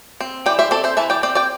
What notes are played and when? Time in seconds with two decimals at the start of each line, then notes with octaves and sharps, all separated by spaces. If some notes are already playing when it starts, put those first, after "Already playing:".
0.21 C4
0.46 E3 D5 G5
0.59 C5 E5
0.71 C4 A4 D5
0.84 C5 E5
0.97 E3 E5 A5
1.10 D5 G5
1.23 C4 D5 G5
1.35 D5 G5